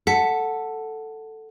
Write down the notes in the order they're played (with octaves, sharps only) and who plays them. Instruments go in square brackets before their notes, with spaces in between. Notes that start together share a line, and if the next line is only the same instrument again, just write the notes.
[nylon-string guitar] A4 [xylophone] F#5 B6